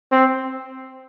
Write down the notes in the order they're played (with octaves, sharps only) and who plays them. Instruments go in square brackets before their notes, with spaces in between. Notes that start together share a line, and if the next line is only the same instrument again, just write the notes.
[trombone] C4